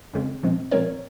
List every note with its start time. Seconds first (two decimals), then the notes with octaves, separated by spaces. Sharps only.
0.14 F2 C#3 G#3 C4
0.43 A#2 F3 G#3 C4
0.71 A#2 F3 G#3 C4 A#4 C#5